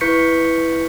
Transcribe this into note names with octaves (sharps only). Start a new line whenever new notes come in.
E4 B4 C#6 G6 B6 C#7